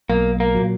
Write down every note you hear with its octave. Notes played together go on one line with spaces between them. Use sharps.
B1 A#3
A#3
A#2 F#3